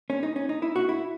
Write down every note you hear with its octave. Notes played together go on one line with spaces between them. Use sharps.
C#4
D#4
C#4
D#4
E4
F#4
E4